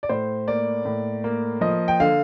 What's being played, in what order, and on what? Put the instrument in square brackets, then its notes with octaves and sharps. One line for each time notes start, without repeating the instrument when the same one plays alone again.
[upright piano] D5
A2 C5
A#3 D5
A2
A#3
F3 D#5
G5
D3 F5